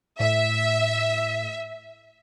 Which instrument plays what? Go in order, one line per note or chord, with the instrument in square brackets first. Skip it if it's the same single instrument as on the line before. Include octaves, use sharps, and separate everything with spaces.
[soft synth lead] A2 [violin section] E5